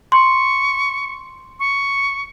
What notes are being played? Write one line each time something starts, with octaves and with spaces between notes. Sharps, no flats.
C6 C#6
C#6